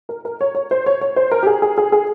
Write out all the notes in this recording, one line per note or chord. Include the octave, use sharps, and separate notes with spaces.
A#4
A#4
C#5
C#5
C5
C#5
C#5
C5
A#4
G4
G#4
G#4
G#4
G#4